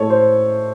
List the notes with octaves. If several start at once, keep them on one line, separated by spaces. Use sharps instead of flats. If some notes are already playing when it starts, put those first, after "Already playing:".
Already playing: A2 G#3 A4 C#5
C5